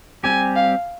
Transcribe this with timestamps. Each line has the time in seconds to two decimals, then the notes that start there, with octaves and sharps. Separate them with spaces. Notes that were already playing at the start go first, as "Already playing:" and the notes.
0.24 G3 C4 G4 G#5
0.56 F5